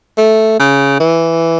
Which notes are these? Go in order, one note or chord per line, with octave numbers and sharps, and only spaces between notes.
A3
C#3
E3